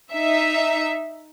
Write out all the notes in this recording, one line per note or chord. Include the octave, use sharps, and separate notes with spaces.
D#4 E5